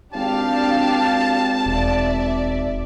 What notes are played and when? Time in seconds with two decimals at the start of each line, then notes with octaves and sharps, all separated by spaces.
0.14 G#1 D4 G4 F5 A5
1.66 E1 D5 E5